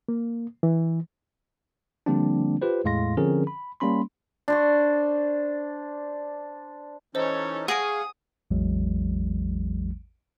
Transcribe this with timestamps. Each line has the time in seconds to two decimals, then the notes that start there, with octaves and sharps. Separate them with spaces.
0.09 A#3
0.63 E3
2.06 D3 F3 G3 A#3 C4 D4
2.62 F4 G4 B4 C5
2.84 E2 A2 G#3 F5 C6 A#6
3.17 D3 F3 C4 C#4 G#4 A#4
3.47 B5
3.80 G3 A#3 C#4 B5 C6
4.48 D4 C5 C#6
7.15 E3 C#4 D#4 A4 C5 C#5 D#5
7.68 G#4 F5 F#5 C#6 D#6 A#6 D7
8.51 A1 E2 E3 F#3 G#3